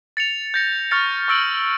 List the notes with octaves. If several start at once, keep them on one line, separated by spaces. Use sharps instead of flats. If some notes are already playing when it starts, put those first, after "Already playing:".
A6 C#7 F7
G6 A#6 C#7
C#6 F6 A6 C#7 F7
C#6 E6 A6 D7 F#7